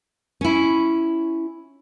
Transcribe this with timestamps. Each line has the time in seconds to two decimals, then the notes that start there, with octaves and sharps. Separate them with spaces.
0.41 C#4 E4